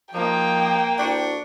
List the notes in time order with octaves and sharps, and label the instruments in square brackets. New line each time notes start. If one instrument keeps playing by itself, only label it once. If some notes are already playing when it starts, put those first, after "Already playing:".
[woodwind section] F3 [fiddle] A#3 [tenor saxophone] D#4 [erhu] G5
[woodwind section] D2 E4 C#6 [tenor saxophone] D4